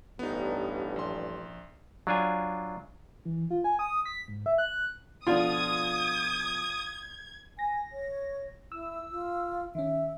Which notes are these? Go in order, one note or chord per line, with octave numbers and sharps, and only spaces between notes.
A1 G2 B3 D#4
A#1 C6
F#3 D4 F4 G#5
E3
F4
G#5
D#6
B6
G#2
E5
F#6
B2 D3 F3 F4 D5 D#6 G#6
G#5 A#6
C#5
E4 E6
F4
D#3 C#4 E5